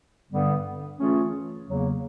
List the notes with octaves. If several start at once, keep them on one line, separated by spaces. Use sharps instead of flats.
G2 D3 G3 B3
E3 A3 C#4 F4 G#4
E2 C#3 F#3 A#3